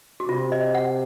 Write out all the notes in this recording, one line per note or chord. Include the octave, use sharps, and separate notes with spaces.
F#4
C3 F4
D#5
F#5